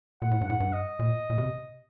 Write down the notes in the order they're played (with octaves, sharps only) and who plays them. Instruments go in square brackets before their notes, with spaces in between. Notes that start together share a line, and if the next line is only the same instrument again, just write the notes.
[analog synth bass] A#2 [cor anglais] F#5
[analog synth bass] A2
G2
[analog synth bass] A2 [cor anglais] F#5
[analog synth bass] G2
[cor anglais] D#5
[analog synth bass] A#2
A#2
C3